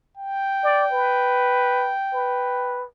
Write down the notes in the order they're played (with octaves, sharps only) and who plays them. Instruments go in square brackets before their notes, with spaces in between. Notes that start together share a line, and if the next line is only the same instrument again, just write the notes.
[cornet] G5
[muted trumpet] D5
B4
B4